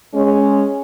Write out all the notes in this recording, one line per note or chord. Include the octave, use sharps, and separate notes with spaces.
G#3 C#4